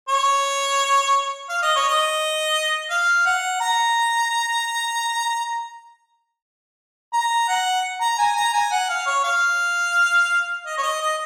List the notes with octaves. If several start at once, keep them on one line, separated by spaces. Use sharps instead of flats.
C#5
F5
D#5
C#5
D#5
F5
F#5
A#5
A#5
F#5
A#5
G#5
A#5
G#5
F#5
F5
C#5
F5
D#5
C#5
D#5
D#5